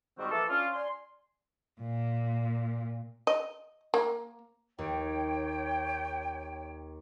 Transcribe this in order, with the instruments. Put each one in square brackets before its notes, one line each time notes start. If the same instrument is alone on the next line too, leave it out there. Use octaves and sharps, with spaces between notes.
[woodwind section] G#2 D#3 G3 C4 F#4
E3 F3 A#3 A4
C#4 D4 F4
D5 G#5 C6
[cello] A#2
[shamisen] D#5
A#3
[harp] D#2 [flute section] C#5 G5